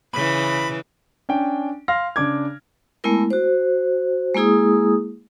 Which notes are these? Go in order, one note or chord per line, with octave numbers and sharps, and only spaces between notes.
C#3 E3 B5 B6
C#4 D4 G5
F5 C6 F6 A#6
C#3 D4 D6 G#6
G#3 A3 B3 E4 A#4
F#4 C5
G#3 A#3 E4 G#4 D#6